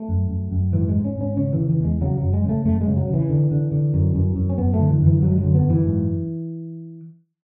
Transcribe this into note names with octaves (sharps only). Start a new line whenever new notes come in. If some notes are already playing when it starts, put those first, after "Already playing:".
Already playing: A3
F#2
F#2
F#2
G#2 E3
G#3
G#2
C#4
G#2
C#4
C#3 C#4
E3
C#3
E3
E2
G#3
C#3 F#3
F#2 F#3
G#3
C#3 A3
F#2 A3
G#3
C#3
F#3
C#3
E3
D3
D3
D3
F#2
F#2
F#2
C#4
F#2 B3
A3
D3
E3
F#2
E3
F#2 F#3
G#3
F#3
D3
B3
F#2 E3
G#2